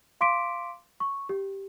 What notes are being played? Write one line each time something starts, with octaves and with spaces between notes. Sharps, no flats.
F5 C6 D6 B6 D7
C#6
G4